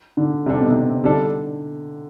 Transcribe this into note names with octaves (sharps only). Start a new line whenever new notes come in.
D3
C3 G3 D4 A4
B2
C3
B2
C3
D3 G3 D4 A4